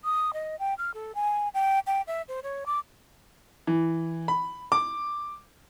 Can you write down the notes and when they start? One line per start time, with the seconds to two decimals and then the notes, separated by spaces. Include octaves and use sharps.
0.04 D#6
0.33 D#5
0.59 G5
0.78 F6
0.94 A4
1.15 G#5
1.54 G5
1.87 G5
2.07 E5
2.28 C5
2.43 C#5
2.66 D6
3.67 E3
4.28 B5
4.72 D6